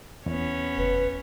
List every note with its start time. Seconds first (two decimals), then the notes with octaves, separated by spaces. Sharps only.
0.26 E2 B3 C#4 C#5
0.78 F#1 B4